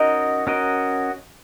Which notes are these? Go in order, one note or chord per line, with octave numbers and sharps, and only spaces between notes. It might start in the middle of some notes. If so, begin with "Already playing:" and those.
Already playing: C#4 D#4 F#4 A#4 D#5
C#4 F#4 A#4 D#5